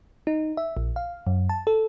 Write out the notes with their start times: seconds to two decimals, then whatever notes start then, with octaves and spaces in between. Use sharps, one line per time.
0.27 D#4
0.57 E5
0.77 A#1
0.96 F5
1.27 F#2
1.49 A5
1.67 A4